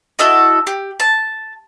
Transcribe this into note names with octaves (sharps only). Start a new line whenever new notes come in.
E4 F#4 A4 D#5
G4
A5